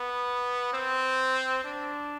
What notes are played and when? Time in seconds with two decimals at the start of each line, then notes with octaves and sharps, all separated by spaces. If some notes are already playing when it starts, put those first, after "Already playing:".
Already playing: B3
0.73 C4
1.64 D4